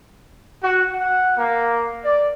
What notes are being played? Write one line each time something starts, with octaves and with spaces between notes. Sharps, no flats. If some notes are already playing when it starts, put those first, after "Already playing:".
F#4
F#5
A#3
D5